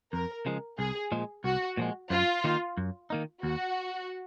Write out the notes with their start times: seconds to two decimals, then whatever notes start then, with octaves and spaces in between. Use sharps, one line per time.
0.13 F2 A#4
0.46 C#3 F3 G#3
0.78 C2 G#4
1.12 A#2 F3 G#3
1.44 C2 F#4
1.77 A#2 F3 G#3
2.10 F#2 F4
2.44 D#3 A#3 D#4
2.77 F#2
3.10 D#3 A#3 D#4
3.43 D#2 F#4